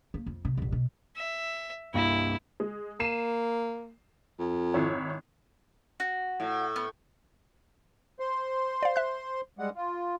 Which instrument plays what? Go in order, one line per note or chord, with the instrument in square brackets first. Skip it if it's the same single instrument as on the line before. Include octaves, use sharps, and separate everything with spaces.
[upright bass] A#3
F2
C3
F1 A#1
B2
[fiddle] E5
[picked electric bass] C2 G2 A#3 [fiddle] E4
[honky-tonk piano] G#3
[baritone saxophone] A#3 [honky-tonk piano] C7 D#7 E7
[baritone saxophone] F2
[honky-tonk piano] G#1 E4 C#5
[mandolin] F#4
[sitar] A2
[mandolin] B3 F6
[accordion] C5 C6
[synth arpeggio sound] D5 F5
E5 F#6
[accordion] G3 G#3 F#5
F4